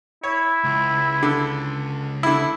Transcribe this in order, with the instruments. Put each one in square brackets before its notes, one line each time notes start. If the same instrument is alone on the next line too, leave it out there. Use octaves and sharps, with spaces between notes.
[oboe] E4 [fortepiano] C#5
[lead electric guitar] C#2
[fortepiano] D3
D3 E4